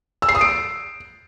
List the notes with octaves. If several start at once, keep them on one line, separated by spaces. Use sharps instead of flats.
E6
C7
D#6
D7